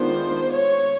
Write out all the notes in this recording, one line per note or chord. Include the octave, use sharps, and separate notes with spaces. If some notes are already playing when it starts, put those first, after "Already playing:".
Already playing: D#3 G#3 B3 D4 F4 C5
C#5